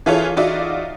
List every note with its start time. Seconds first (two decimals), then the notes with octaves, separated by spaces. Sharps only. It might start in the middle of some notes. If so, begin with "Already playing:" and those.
0.06 E3 E4 F4 G#4 A4 C#5
0.37 D#4 F4 F#4 D5 E5